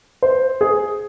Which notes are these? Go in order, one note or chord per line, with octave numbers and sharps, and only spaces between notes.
C5
G#4